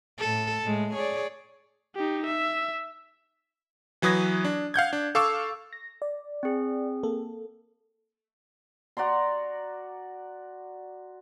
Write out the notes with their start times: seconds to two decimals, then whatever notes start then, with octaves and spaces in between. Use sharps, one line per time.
0.19 A2 A4
0.63 A2 G#3
0.94 G#4 C#5 D5
1.96 D#4 G4
2.26 E5
4.02 E3 F#3 B4 D#6 G#6 A#6
4.45 D4
4.74 F5 F#5 G6 G#6
4.93 D4
5.15 A4 F5 C#6 D6 E6
5.73 A#6
6.02 D5
6.43 C4 G#4
7.03 A#3 A4
8.97 F#4 D5 A#5 C6